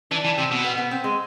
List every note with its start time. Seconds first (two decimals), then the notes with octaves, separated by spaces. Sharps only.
0.11 E3 D4
0.24 E3
0.38 C3 C4
0.51 B2
0.64 B3
0.78 B3
0.91 C4
1.04 G#3